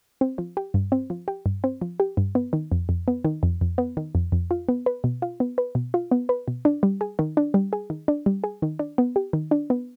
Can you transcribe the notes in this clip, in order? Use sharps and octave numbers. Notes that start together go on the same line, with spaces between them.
C4
F3
G4
G2
C4
F3
G4
G2
C4
F3
G4
G2
B3
D#3
F2
F2
B3
D#3
F2
F2
B3
D#3
F2
F2
F4
B3
B4
B2
F4
B3
B4
B2
F4
B3
B4
B2
D4
G3
G#4
D#3
D4
G3
G#4
D#3
D4
G3
G#4
D#3
D4
B3
G4
D#3
D4
B3